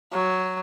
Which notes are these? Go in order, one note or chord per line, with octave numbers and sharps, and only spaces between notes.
F#3